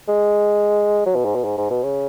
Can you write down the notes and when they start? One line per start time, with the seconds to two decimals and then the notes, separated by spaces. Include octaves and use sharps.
0.08 G#3
1.06 F#3
1.15 B2
1.25 G#2
1.35 B2
1.44 G#2
1.58 G#2
1.70 B2
1.84 C#3